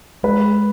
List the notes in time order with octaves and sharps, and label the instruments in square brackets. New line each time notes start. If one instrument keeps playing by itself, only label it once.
[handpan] G#3 [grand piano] B4